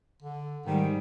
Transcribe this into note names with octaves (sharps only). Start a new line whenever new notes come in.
D3
G#2 D#3 G3